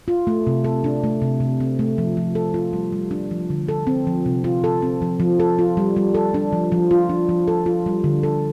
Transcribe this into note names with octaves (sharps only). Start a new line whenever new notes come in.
F4
A3
C3
A4
D4
A3
C3
C3
C4
A3
F3
F3
A4
F4
G3
G3
D4
F3
D3
A4
C4
F3
C3
F4
A4
C4
F3
F3
A4
F4
G3
G3
A4
D4
F3
F3
F4
D4
F3
A4
F4
G3
D3
A4